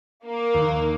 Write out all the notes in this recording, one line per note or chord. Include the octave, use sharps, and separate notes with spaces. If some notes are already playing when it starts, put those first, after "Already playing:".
A#3
D#2